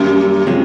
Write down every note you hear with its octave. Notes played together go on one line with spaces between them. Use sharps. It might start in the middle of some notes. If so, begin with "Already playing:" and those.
Already playing: F#2 D#3 G3 A#3
C3 F3 G#3 C#4